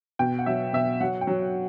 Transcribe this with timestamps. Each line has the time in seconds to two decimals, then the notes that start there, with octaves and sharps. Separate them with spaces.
0.19 B2 G5
0.39 F#5
0.46 F#3 E5
0.73 B2 E5
1.01 F#3 F#5
1.21 G5
1.27 F#3